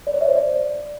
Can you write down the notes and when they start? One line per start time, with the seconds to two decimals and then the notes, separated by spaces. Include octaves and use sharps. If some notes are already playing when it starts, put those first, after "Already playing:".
0.07 D5
0.14 C#5
0.21 E5
0.28 C5
0.35 D5